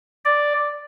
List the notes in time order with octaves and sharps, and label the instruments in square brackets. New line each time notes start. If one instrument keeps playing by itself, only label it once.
[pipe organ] D5